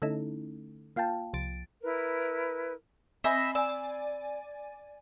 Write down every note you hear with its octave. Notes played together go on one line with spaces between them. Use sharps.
D3 A3 C#4 D#4 E4 A4
A#3 F4 F5 G5 A5
C2 F3 A6 D7
E4 A#4 B4
C4 D#5 E5 G#5 B5
D5 G#5 E6